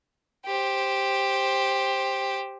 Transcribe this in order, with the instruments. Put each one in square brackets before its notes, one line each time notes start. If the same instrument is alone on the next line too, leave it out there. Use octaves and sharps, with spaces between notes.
[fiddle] G4 C5